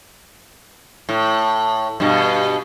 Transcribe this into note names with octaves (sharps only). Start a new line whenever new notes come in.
A2
G2 B2